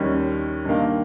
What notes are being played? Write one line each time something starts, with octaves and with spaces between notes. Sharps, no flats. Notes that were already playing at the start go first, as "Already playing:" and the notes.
Already playing: D#2 D#3 G3 C#4
G2 D#3 A#3